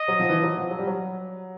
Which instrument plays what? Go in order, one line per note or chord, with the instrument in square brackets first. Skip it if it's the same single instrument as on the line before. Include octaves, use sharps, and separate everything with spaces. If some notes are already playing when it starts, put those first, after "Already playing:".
Already playing: [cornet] D#5
[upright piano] F#3
F3
E3
F#3
F3
F#3
G3
F#3